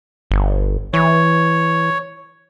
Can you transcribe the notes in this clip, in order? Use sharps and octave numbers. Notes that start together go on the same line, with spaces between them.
G1
E3 C#5